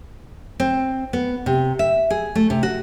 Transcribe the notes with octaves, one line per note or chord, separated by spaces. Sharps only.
C4
B3
C3
E5
G#4
A3
C3
F#4